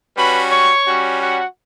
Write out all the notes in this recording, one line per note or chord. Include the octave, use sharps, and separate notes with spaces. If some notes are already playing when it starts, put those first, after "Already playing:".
G3 C#4 F#4 B4 B5
C#5 C#6
G3 C#4 F#4
F#4 F#5